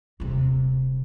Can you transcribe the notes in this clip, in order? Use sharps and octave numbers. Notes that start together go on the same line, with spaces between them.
D#1 C3